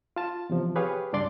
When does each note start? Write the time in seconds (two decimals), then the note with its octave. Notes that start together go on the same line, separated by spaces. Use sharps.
0.16 F4 A5
0.49 E2 C3 F3
0.76 G4 G#4 B4 C#5 F5
1.13 C#2 G2 D4 D5 C6 A6